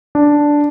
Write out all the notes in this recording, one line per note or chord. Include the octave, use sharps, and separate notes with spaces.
D4